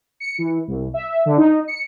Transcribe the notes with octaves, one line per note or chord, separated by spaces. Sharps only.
C#7
E3
C2
E5
D3
D#4
C#7